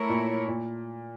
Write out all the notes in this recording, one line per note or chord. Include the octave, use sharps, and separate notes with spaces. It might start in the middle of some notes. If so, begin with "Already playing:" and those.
Already playing: A3 E4 A#4 C#5
A#2
A#2